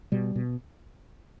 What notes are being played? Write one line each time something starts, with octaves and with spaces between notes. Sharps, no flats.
B2 G3
B2